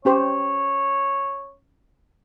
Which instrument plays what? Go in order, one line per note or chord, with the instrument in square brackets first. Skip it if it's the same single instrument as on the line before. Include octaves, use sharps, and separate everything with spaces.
[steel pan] C#4 G4 C5 [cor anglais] C#5